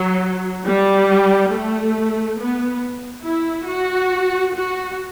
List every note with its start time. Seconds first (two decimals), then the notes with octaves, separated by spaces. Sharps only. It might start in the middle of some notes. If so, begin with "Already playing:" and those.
Already playing: F#3
0.65 G3
1.51 A3
2.39 B3
3.25 E4
3.68 F#4
4.55 F#4